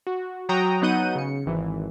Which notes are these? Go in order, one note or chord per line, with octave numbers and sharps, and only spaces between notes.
F#4
F#3 F#4 G5 A#5 D#6
F#3 B3 D#4 F#5 G6 D#7
C#3 C#7
G#1 E3